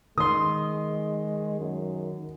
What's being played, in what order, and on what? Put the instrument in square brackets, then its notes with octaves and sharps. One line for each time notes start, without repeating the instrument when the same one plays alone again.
[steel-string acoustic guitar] D#3 [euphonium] G#3 [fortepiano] C6 D#6
[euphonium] F#2